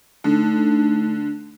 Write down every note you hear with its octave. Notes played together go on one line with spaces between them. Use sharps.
D3 A3 D#4